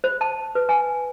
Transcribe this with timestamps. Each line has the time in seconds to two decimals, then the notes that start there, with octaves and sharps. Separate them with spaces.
0.04 C5
0.21 A5
0.55 B4
0.69 G#5